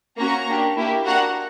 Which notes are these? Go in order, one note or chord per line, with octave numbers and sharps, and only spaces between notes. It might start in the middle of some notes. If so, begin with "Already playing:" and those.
A#3 C#4 F#4 A#5 C#6
A#3 D4 G4
A#3 E4 G4
A#3 D4 F#4 F#5 A#5